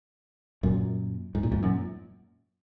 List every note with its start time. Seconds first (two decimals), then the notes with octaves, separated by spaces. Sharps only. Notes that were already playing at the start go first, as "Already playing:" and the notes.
0.63 F#2 A#2
1.35 G#2
1.43 A#2
1.52 E2 G#2
1.63 F#2 A#2